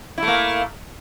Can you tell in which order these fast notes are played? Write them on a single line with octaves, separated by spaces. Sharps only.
E4 A3 A#3